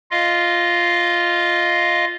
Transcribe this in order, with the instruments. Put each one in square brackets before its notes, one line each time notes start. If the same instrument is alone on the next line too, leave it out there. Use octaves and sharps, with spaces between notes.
[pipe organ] F4 D#5 F5